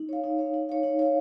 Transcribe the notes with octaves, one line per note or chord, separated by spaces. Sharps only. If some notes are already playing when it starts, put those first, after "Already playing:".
Already playing: D#4
C#5 F5
D#4
C#5 F5
D#4
C#5 F5
D#4
C#5 F5